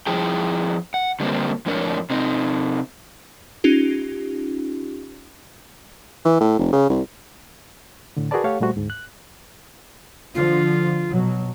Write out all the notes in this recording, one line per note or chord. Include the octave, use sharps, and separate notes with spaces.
F3 E4 G#4 G5
F#5
D3 G3 A#3 C4
F2 A2 D4 A#4 C#5
C3 C4 D#4
C#4 D#4 F4 G4
E3
A2
F1
C#3
C2
A2 D3
F#4 G#4 A#4 B4 D5 A5
A3 G4 A4 C#5 F5 F#5
A#2 G3 A3 F#4 C5
D2 G#2
F#6
D3 F3 F4
B2 F#3